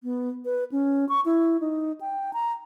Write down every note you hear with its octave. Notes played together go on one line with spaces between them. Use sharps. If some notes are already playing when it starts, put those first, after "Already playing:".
B3
B4
C#4
C#6
E4
D#4
G5
A#5